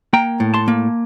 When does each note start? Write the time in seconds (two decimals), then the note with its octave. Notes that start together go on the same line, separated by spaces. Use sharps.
0.13 A#3 G5 A#5
0.40 A2
0.54 A5 C6
0.68 A#3